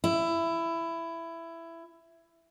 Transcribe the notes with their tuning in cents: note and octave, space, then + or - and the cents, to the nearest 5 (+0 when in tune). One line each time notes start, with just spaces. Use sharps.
E4 +15